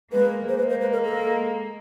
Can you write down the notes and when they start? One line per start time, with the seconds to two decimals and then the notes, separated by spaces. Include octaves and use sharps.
0.12 G#3 A#3 B4
0.49 C5
0.58 G#3 A#3 B4
0.70 C5
0.81 B4
0.93 A#4
1.05 A4